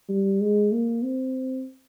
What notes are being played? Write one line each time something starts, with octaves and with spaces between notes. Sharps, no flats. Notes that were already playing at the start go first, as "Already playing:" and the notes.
G3
G#3
A#3
C4